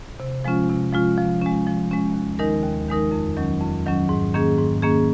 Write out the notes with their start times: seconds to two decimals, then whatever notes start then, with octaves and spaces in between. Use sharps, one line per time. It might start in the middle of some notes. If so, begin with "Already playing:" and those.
0.20 C3
0.44 F3 G#3 C#4 F4
0.69 C3
0.93 F3 G#3 C#4 F4
1.18 F3
1.42 G#3 C#4
1.67 F3
1.91 G#3 C#4
2.14 D#2
2.39 D#3 G#3 D#4 A#4
2.63 D#2
2.88 D#3 G#3 D#4 A#4
3.12 F2
3.37 D#3 F#3 C#4
3.60 F2
3.86 D#3 F#3 C#4
4.09 G#2
4.34 D#3 A#3 C#4 G#4
4.58 G#2
4.82 D#3 A#3 C#4 G#4